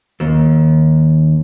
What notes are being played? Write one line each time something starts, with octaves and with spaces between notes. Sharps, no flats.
D#2